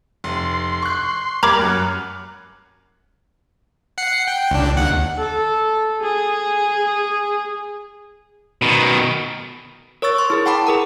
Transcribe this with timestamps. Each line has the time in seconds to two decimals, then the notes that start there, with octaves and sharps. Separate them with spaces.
0.24 F1 C6
0.83 C#6 F#6
1.43 G3 A#3 A#4 A#5 B5 D6 F6 G#6
1.62 F#2 F#5
3.98 F#5 C7 C#7
4.28 G5
4.51 C#2 D4
4.77 D#2 F#5
5.20 A4
6.00 G#4
8.62 B2 D#3
10.02 A#4 C#5 C#6 E6 A6
10.18 C6 C#6
10.30 E4 G#4 A#4
10.46 F#5 G5 A5 B5 D6
10.67 G#4 A#4 A#5